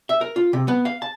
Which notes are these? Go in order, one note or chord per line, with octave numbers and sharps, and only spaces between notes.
E5
A#4
F4
C3
B3
F5
A5